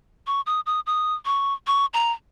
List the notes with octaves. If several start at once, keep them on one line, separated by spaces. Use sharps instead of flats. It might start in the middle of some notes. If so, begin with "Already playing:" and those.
C#6
D#6
D#6
D#6
C#6
C#6
A#5